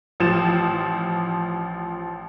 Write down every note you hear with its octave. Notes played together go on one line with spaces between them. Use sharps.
A1 F3 E7